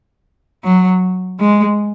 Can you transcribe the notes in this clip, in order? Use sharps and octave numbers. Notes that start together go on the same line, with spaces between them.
F#3
G#3